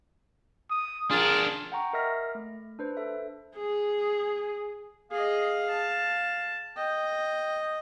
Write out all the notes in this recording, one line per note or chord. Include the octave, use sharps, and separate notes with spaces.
D#6
D4 F4 G#4 A#4
F#5 G5 A#5 C#6
A#4 D#5 E5 F6 A#6
A3
D4 B4 C5
A4 E5
G#4
G#4 D#5 F5
A5
D#5 G5